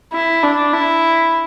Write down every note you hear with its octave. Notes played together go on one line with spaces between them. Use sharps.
E4
D4
E4